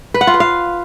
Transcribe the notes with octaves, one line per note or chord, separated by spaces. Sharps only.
B4
F#5
F4
B4
F5